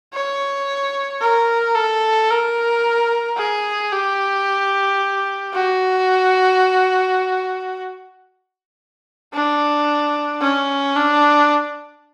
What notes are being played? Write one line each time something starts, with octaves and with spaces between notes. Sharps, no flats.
C#5
A#4
A4
A#4
G#4
G4
F#4
D4
C#4
D4